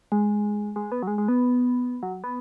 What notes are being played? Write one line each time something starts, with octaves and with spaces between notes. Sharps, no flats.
G#3
G#3
B3
F#3
G#3
G#3
B3
F#3
B3